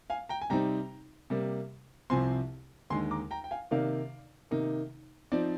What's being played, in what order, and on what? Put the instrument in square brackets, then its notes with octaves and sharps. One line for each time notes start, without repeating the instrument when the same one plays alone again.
[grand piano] F5 G#5
G5 A#5
G#5
C3 G3 C4 D#4 G5 A#5
C3 G3 A#3
C2 C3 F3 C4 G#5 C6
D#2 D3 G#3 D#4 G#5 C6
A#5 D6
G5 A#5
G5
F5 G#5
C3 D#3 A#3 D#4 D5 F5
C3 D#3 A#3 D#4
F3 C4 D#4 D5